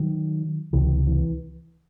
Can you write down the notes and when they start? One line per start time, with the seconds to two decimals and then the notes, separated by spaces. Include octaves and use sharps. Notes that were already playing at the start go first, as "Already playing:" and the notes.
Already playing: D#3 F#3
0.73 C#2 C3 E3
1.07 E3